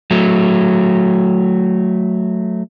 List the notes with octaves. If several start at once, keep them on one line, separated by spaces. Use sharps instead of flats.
F#3 A3